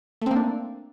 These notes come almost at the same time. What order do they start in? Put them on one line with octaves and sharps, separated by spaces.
A3 C4 A#3 D4